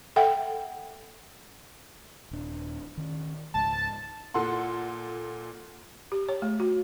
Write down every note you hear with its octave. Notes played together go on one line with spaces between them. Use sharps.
A4 E5 F#5 G5
D#1 D4
D#3 C#4
C#2 G#2 A5
A#2 A4 F#5 C6
G4
C#5
A3
F#4